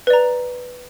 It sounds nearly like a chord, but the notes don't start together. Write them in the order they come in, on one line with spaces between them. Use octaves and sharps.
B4 D5 A#5